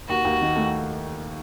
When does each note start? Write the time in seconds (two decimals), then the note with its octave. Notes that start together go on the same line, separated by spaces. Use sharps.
0.09 D#2 F#4
0.25 D#2
0.41 D#3
0.56 A3